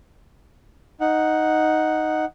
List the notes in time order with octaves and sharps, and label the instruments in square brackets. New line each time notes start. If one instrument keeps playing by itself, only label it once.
[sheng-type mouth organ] D#4 F#5